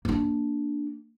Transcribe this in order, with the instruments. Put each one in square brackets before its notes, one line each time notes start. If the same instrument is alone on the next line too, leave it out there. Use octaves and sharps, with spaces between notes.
[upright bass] A#3 D4